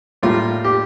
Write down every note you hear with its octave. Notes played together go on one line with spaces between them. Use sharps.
A2 G3 A#3 F4
G4